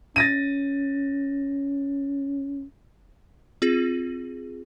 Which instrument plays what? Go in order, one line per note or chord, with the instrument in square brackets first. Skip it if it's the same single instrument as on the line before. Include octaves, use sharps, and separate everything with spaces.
[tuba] C#4 [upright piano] A6 A#6 D#7
[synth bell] C4 F4 G#4